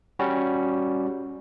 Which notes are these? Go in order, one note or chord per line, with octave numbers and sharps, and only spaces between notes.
G3 C#4 F#4